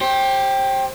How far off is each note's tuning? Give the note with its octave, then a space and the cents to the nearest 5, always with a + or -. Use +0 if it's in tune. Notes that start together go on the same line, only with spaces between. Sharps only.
G4 +0 C5 +35